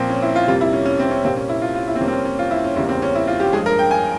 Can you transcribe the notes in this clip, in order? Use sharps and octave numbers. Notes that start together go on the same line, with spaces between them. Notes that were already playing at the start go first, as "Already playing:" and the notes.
Already playing: A#2 F3 A#3 C4
C#4
E4
F4
F2 C3 G3 A#3 F4
E4
C#4
C#4
C4
C#4
C2 A#2 G3 A#3 C4
C#4
E4
F4
F4
E4
C4
F2 C3 G3 A#3 C#4
C4
C#4
C#4
F4
E4
C#4
E2 C#3 G3 A#3 E4
C4
C#4
E4
F4
G4
G2 F3 G#3 G#4
A#4
G5
G#5